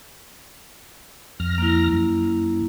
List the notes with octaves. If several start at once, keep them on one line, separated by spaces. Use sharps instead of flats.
F2 F6 A#6
A#3 E4
F#2